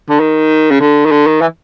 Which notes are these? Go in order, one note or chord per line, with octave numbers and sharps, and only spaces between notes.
D3
D#3
C#3
D3
D#3
D3
D#3
E3